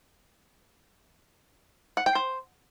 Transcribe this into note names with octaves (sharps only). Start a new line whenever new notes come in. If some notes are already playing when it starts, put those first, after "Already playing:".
F#5
G5
C5